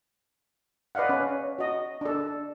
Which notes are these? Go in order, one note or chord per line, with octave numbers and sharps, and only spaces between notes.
B4 D5 D#5 F5 F#5
C#4
F#4 D#5
D4 A4